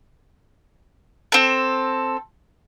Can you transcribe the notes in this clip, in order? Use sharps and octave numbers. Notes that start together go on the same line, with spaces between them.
C4 A4